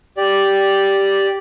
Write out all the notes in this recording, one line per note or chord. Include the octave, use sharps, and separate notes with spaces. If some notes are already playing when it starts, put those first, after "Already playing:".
G4 D5